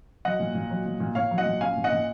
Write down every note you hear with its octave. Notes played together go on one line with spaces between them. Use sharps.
F#3 D#5 F#5
A#2
A#2
F#3
A#2
A#2
A#2 C#5 F5
F#3
D#5 F#5
A#2
C#4 F5 G#5
A#2
D#5 F#5
A#2